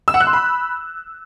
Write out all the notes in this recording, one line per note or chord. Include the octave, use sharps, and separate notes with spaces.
E6
F#5
F#6
C6
B5